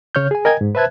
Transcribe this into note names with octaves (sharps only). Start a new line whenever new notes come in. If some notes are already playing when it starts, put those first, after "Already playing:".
C#3 C#5 F6 G6
G#4 G#5
A#4 D#5 G5 G#5 G#6
G#2
B4 C5 E5 A5 F#6 G#6